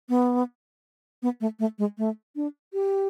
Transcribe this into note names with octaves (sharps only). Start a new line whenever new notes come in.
B3
B3
A3
A3
G#3
A3
D4
G4